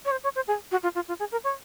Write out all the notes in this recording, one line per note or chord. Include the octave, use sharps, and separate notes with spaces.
C#5
C5
C#5
C5
G#4
F#4
F4
F4
F4
G#4
A#4
C#5